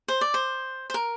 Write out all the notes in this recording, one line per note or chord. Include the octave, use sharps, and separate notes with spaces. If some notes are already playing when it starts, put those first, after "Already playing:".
C5
D5
C5
C5
A#4